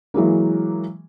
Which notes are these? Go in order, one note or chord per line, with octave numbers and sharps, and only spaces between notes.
E3 F#3 G#3 A#3